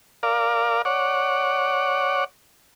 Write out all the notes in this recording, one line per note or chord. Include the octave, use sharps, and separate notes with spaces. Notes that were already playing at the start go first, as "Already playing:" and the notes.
A#4 D5 F5
C#5 D5 F#5